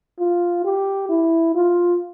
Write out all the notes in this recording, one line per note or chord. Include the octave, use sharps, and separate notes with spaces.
F4
G4
E4
F4